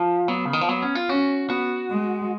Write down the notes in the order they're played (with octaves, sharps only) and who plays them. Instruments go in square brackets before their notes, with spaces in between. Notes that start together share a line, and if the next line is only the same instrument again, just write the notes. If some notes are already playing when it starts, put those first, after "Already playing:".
Already playing: [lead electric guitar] F3
[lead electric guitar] F#3 [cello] B3
[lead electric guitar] C#3
D#3
F3
[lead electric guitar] F#3 [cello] B3
[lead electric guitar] C#4
F4
[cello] C#4 [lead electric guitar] F#4
[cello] B3 [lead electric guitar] F#4
[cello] G#3